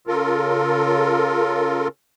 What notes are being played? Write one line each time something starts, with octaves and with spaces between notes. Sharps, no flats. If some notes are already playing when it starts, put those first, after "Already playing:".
C#3 F4 A4 A#4